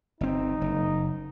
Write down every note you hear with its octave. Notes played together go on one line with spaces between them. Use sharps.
G1 C4 D#4
F#1